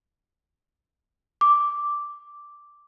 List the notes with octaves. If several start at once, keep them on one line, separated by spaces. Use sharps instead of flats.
D6